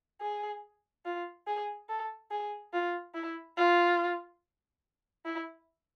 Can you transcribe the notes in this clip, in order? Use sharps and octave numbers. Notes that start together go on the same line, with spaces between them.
G#4
F4
G#4
A4
G#4
F4
E4
F4
E4